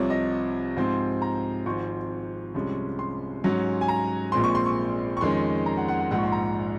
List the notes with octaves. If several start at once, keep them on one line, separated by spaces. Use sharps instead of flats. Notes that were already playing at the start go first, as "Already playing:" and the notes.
Already playing: C2 C3 F3 C#5
D#5
G#2 F3 C4
A#5
G#1 G#2 F3 C4 C#6
C2 C3 F3 G#3 C#4
C6
G#2 F#3 C#4
G#5
A#5
A#1 A#2 G#3 C4 C6
C#6
C6
C#6
C#6
F2 D#3 G#3 C#4 C6
A#5
F#5
F#5
F#5
A#1 G#2 F3 F#5
C#6
C6
A#5